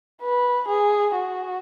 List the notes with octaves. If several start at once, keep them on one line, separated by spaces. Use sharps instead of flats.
B4
G#4
F#4